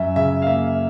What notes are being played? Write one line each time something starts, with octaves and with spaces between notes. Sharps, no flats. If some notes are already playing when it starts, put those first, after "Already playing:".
Already playing: F#2 E5
C#3 E5
F5
A#3 E5